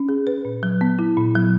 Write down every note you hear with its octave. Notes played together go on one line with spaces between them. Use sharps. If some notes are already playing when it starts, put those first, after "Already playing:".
Already playing: C#4
G#4
B4
A#2
F#3
B3
E4
A#2
F#3